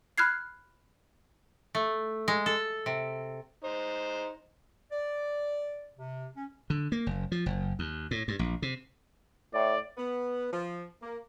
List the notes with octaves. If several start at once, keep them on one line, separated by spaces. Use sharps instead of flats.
B5 F6 F#6 G#6 C7
A3
G#3
A4
C3
D#4 C5
D5
C3
C#4
D3
A#3
F#1
F3
F#1
D#2
A2
G2
A#1
C3
A2 D5
B3
F3
A#3